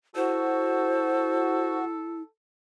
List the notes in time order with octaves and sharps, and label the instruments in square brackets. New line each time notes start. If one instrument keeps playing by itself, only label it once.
[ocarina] E4 [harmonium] F#4 [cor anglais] A4 [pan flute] C5